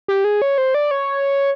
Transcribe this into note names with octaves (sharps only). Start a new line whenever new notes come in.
G4
G#4
C#5
C5
D5
C#5